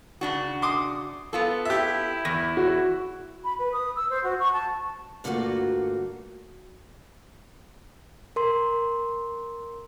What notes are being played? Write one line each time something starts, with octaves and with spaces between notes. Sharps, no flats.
C#3 D4 F#4
C6 D6 D#6
B3 F4 A4
E4 G4 E5
E2 A#6
F#4
B5
B4
D#6
E6
C5
F#4
C#6
A5
G2 D3 A3 A#3 F4 F#4
A#4 C6